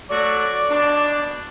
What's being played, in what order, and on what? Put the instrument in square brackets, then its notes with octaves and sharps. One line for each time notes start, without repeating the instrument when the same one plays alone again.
[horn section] F#3 A3 F#4 [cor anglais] D5
[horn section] B2 D4